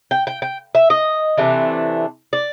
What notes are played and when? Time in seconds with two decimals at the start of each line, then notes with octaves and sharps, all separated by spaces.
0.11 G5
0.27 G5
0.42 G5
0.75 E5
0.90 D#5
1.37 C3 E3 A3 D4
2.33 D5